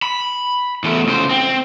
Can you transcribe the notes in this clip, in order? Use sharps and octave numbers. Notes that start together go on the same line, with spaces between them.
B5
E2 A3
C#2 C5
C4